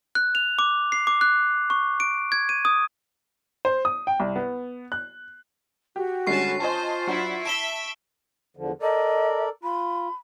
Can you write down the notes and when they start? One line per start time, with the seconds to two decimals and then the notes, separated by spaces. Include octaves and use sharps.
0.15 F#6
0.35 F7
0.59 D6
0.92 C7
1.07 D6
1.21 F#6
1.70 C#6
2.00 D7
2.32 G#6
2.49 D#7
2.65 D#6
3.65 C5
3.85 D#6
4.07 G5
4.20 C2
4.36 B3
4.92 F#6
5.96 F#4 G4
6.27 D3 G3 G#3 C#4 A5 C#6 C7
6.60 F4 C5 D#5 G#5 A5
7.07 F#3 D4 E4 F#5
7.46 E5 A5 D7 E7 G7
8.57 E2 D3 F3
8.82 A4 A#4 D5 D#5
9.63 F4 B5